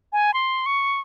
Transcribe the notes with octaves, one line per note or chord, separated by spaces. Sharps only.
G#5
C6
C#6